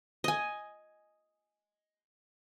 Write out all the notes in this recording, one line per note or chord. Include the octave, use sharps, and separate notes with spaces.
D#5 G#5